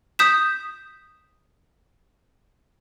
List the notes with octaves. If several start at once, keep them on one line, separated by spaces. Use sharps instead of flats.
D#6 G6 B6 E7